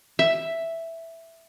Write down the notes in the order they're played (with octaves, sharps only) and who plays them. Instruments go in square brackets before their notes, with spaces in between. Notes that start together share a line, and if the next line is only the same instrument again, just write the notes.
[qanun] E5